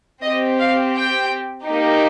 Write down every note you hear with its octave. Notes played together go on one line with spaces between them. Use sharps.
C4 G4 D#5
F5
G5
A#3 D#4 G4